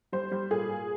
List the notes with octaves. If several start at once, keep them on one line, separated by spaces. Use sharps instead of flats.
G3 C5
G3
A#2 G#4
A#2